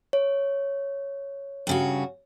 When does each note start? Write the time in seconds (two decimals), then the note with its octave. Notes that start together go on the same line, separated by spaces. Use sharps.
0.13 C#5
1.67 G2 C#3 F#4